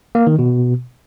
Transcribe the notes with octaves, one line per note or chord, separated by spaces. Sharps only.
A#3
D#3
B2